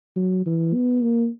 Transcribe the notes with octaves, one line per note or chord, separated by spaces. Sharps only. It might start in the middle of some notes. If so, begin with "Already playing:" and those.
F#3
E3
B3
A#3